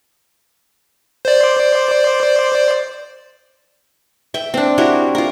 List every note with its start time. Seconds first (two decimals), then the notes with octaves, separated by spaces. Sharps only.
1.25 C5 D5
4.34 E5 G5
4.54 C4 D4
4.78 E4 F#4 G4 A#4
5.15 F4 A#4